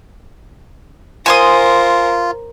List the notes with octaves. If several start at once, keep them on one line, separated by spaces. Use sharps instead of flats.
F4 A#4 C5 G#5 C6 D#6